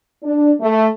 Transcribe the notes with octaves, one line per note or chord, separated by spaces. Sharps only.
D4
A3